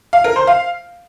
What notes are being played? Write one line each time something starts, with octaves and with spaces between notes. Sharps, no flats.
F5
A#4
C5
F5